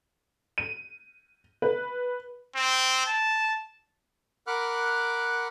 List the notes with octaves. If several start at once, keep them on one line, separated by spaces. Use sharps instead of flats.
D#7
B4
C4
A5
A#4 F#5 B5 D6 F6 F#6